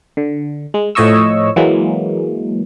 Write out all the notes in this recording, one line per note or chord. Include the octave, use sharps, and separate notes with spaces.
D3
G#3
A2 F3 C#5 D#5 C#6 E6
E3 F#3 G#3 A#3